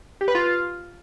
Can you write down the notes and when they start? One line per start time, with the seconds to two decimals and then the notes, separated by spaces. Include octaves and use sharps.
0.21 G4
0.28 B4
0.35 F4